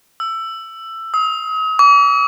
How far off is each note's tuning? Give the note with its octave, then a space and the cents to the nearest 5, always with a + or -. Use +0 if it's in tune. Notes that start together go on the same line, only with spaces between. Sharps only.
E6 +15
D#6 +40
D6 -45